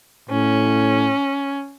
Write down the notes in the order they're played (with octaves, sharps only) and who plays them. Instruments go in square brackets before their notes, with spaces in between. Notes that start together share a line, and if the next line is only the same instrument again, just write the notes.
[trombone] A2 [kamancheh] C#4